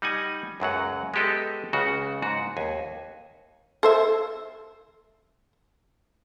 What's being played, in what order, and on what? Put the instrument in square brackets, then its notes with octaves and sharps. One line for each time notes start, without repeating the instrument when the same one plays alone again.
[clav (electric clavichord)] G3 D#4 F#5 G#5
C#2 F#2 F#3 F#5
G#3 B3 G4 A4 D#5
C#2 C#3 F#4
G#2 F#4
D#2 G#5
[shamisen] A4 C5 E5